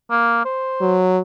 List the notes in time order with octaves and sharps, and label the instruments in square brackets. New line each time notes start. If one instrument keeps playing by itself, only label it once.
[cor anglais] A#3
C5
[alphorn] F#3